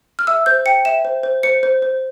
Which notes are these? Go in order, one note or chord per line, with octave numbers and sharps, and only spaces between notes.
F6
E5 E6
C5 G6
G5 C#7
E5 E7
C5
C5
C5 C#7
C5
C5